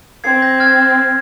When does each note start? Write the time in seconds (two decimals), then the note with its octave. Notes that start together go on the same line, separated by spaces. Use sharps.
0.24 C4 G#6 C7
0.42 G6 A#6
0.60 F6 G#6
0.79 F6